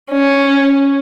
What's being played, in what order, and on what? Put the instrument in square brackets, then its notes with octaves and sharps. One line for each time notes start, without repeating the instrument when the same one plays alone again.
[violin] C#4